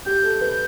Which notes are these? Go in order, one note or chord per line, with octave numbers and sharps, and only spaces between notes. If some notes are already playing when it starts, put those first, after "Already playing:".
G4 G6
A4
B4